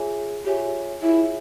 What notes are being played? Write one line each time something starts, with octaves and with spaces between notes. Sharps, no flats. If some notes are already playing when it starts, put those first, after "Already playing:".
Already playing: F4 G#4 C#5 E5 G#5
F4 G4 G#4 C#5 E5 G#5
E4 F4 G#4 C#5 E5 G#5